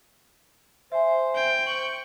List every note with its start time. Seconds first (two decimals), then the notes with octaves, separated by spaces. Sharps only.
0.92 C5 E5 G#5
1.35 G5
1.67 C#6 F#7